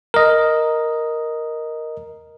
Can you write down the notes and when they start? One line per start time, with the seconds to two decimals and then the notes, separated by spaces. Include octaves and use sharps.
0.14 A#4 D#5